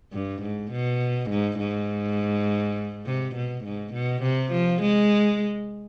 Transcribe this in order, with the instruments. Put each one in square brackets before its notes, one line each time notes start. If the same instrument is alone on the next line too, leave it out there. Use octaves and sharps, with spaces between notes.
[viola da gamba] G2
G#2
B2
G#2
G#2
C3
B2
G#2
B2
C3
F3
G#3